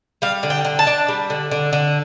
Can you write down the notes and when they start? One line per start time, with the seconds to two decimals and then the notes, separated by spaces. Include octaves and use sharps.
0.22 G3 F5
0.43 D3
0.50 G5
0.65 D3
0.79 A5
0.87 D4
1.09 G3
1.30 D3
1.51 D3
1.73 D3